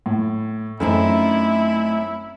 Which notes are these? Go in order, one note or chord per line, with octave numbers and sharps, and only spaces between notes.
A2
F#2 A3 C4 D#4 E4